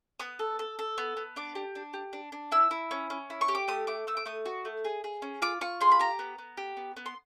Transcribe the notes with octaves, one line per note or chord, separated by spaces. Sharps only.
B3 D#6
A4
A4
A4
B3
B3
D4 D6
G4
D4
G4
D4
D4
E4 E6
E4
C#4
C#4
E4
C#6
G4
D6
A3 D#6
A3 D6
A3 E6
D6
A3 D#6
F#4
A3
G#4
G#4
C#4
F4 D6
F4 C#6
G#4 C6
B5
G4 A#5
B3
B3
G4
B3
B3
C6